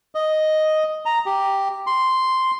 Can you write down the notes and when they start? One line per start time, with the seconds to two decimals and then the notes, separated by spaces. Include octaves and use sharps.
0.15 D#5
1.06 A#5
1.26 G4
1.87 C6